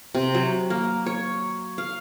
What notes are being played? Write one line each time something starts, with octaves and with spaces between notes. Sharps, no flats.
C3
F#3
A#3
C#5
F5